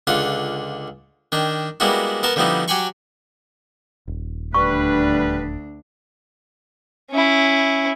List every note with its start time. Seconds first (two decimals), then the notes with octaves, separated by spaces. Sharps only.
0.07 C#2 D3 F4 F#5
1.32 D#3 D4 G5
1.80 G3 G#3 A#3 B3 E4 F#4
2.23 B3 A#4 A5
2.36 D3 F3 G3 B3 D#4 E4
2.68 F#3 G4 G5 G#5 B5 C#6
4.08 D#1
4.54 D2 G3 D4 B4 C#6
7.11 C#4 E4